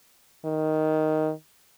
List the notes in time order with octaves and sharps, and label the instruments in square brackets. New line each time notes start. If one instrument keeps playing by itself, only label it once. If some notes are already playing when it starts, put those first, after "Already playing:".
[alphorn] D#3